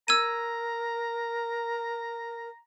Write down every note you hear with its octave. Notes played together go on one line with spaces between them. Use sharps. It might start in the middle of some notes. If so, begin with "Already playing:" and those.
A#4 A#5 E6 G#6 D#7